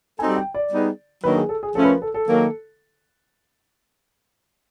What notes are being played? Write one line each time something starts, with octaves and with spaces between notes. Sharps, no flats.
G3 C4 D#4 F#4 A4 G#5
G5
D5
G3 B3 D#4 G#4
D#3 F#3 A#3 D4 B4
G#4
A4
G#4
F3 A3 C#4 A4
B4
A#4
A4
A4
D#3 F#3 A#3